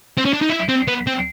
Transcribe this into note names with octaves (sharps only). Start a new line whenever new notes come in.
C4
C#4
D4
D#4
E4
C4
B3
C4